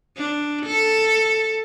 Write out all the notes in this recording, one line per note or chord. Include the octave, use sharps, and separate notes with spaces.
D4
A4